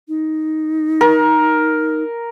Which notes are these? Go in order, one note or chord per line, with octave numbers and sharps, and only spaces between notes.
D#4
A#4